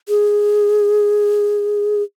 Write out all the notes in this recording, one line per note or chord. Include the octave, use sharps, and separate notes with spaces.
G#4